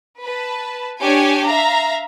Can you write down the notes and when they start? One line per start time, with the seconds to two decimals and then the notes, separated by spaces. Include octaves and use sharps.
0.23 B4 A5
1.01 D4 G4 C#5 G#5
1.46 E5 F5 A#5